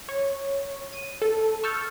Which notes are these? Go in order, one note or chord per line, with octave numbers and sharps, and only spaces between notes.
C#5
D#7
A4
C#6 E6 F6 G6 A6 C#7